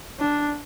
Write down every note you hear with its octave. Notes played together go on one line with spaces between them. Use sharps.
D4